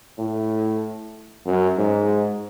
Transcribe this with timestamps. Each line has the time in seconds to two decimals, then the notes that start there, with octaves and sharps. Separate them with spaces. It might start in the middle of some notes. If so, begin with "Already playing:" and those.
0.18 A2
1.46 F#2
1.78 G#2